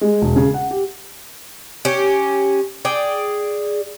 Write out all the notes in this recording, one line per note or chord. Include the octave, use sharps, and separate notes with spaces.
G#3
E1
C#3
F#5
G4
C#4 G4
G#4 D5 G5